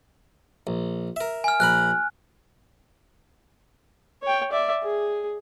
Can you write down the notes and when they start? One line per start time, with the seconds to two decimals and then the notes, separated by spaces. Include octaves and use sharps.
0.67 A#1
1.16 A#4 E5
1.44 G#5 F6
1.60 A#1 A#4 B5 F#6
4.23 C#5 G5
4.52 D5 E5
4.83 G#4